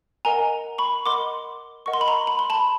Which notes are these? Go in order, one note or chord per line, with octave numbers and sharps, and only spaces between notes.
A#4 D#5 F#5 G#5 A#5
B5 C#6
A#4 D#5 F#5 C6 D6
A#4 D#5 F#5 C#6
C6
B5
A#5 C6
B5
C6
A5 B5